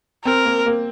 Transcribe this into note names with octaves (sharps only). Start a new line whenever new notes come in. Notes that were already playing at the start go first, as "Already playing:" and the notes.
C4 A#4
A#3
A#3